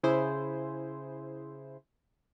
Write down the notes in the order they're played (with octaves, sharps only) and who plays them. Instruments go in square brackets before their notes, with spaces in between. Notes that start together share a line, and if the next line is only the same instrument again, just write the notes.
[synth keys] C#3 E4 G#4 C5